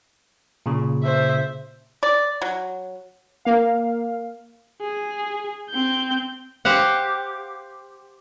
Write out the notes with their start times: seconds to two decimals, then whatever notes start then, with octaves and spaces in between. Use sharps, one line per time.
0.66 A#2 C#3
1.03 C5 E5
2.03 D5
2.42 F#3
3.45 A#3 F5
4.81 G#4
5.70 C4 G6
6.65 G4 C5 F5 F#5